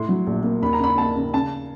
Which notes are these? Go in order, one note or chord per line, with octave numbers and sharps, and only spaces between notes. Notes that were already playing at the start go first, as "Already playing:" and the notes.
Already playing: A2 C6
F#3
A#1
A#3
D#2 B5
A#5
C#3 B5
A#3 A5
C#3
C#3 A5